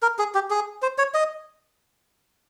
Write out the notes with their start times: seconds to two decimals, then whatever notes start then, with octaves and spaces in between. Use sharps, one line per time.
0.02 A#4
0.19 G#4
0.35 G4
0.50 G#4
0.82 C5
0.98 C#5
1.14 D#5